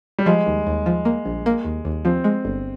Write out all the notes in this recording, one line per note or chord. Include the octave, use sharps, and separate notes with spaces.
G3
F3 G#3
D#2
D#2
F3
A#3
A#1
A#3
D#2
D#2
F3 C4
G#3
G1